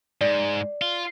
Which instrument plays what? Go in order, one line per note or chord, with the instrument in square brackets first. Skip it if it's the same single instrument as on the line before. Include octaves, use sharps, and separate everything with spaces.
[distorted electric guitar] G#2 [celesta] D5
[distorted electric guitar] F4